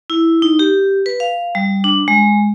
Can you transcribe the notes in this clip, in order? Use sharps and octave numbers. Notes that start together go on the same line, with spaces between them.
E4
D#4
G4
B4
F5
G3
D4
G#3